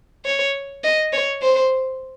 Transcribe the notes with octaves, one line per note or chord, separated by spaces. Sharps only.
C#5
D#5
C#5
C5